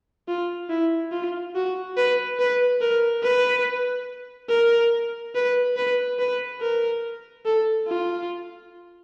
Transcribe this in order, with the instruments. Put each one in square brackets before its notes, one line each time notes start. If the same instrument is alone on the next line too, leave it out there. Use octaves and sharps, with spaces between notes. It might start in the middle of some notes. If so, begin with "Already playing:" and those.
[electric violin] F4
E4
F4
F#4
B4
B4
A#4
B4
A#4
B4
B4
B4
A#4
A4
F4